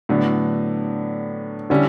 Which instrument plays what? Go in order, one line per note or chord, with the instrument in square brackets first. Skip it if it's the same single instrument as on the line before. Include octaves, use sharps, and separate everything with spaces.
[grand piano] A2 F#3 B3 D4 [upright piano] D3
[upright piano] D3 [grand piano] G3 C#4 E4